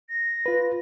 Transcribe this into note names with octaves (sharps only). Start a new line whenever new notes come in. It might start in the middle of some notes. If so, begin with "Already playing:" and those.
A#6
F4 B4